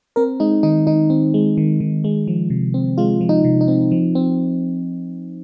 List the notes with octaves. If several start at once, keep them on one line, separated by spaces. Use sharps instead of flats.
C4 A#4
G#3 D#4
D#3 D#4
D#3 D#4
C4
G#3
D#3
D#3
G#3
F3
C3
C4
G#3 F4
F3
D#4
C3
D#4
C4
F3
C4